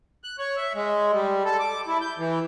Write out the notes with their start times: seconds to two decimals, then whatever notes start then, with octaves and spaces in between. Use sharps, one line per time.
0.24 F#6
0.39 C#5
0.56 E5
0.75 G#3
1.13 G3
1.45 A4
1.60 D6
1.87 E4
2.01 G6
2.18 E3